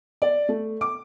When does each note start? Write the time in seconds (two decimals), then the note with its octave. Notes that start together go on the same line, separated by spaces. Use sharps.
0.22 D5
0.49 A3
0.81 D6